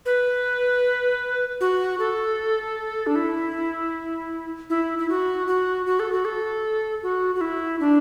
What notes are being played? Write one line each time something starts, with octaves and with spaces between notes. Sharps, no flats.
B4
F#4
A4
D4
E4
E4
E4
F#4
F#4
F#4
A4
F#4
A4
F#4
F#4
E4
D4